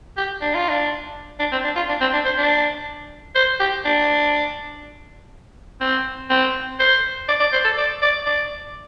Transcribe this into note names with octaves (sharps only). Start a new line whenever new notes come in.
G4
D4
F4
D4
D4
C4
D4
F4
D4
C4
D4
C5
D4
C5
G4
D4
C4
C4
C5
D5
D5
C5
A4
D5
D5
D5